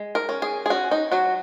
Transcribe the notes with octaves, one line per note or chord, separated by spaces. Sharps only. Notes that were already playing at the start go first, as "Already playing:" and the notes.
Already playing: G#3
A#4
C#4
G#4
G#4
C#4 F#4
D#4
F#3 F#4